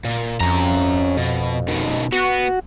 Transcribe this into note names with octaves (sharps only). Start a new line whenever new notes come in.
A#2
F2 C#4 A#5
B2
B2 D#3
B3 F#4